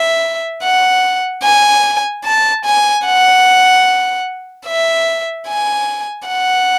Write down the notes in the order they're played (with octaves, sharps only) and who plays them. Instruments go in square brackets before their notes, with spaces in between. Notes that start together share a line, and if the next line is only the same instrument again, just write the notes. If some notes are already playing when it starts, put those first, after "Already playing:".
Already playing: [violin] E5
F#5
G#5
A5
G#5
F#5
E5
G#5
F#5